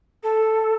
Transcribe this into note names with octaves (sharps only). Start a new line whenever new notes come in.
A4